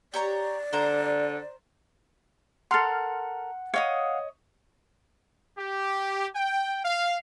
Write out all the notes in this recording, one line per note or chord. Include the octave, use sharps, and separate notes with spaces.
G4 C#5 D5 A#5
D3 C5 A#5
A4 A#4 F#5 C6 F6
C#5 D#5 F5 F#5 D#6
G4
G5
F5